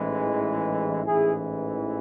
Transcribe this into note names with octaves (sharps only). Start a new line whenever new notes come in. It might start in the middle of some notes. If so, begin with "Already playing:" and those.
Already playing: A1 G#2 E3 G#3
A1 G#2 E3 E4 G#4